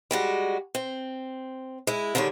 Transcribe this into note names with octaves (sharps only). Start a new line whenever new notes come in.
G3 G#3 F#4
C4
G#3 E4
D3 D#3 G3 G#3 C#5